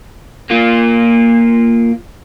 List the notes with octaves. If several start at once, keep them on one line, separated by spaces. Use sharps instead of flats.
A#3 F4